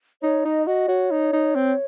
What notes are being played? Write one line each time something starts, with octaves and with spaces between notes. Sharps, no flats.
D#4 C#5
D#4 D#5
F#4 D#5
F#4 C#5
D#4
D#4
C4